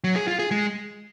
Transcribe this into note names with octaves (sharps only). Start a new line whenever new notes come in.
F#3
G#4
F4
G#4
G#3